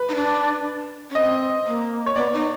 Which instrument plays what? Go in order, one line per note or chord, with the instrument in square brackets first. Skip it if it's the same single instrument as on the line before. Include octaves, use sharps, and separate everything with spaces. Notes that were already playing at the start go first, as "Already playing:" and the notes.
Already playing: [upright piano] B4
[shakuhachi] D#4
D4
C#4
[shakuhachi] C4 [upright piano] D#5
[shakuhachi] A#3
[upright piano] C#5
[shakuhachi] B3 [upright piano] D5
[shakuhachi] D#4